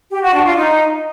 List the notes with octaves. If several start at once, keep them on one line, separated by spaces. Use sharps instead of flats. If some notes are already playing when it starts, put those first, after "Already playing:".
G4
F#4
D4
F4
D#4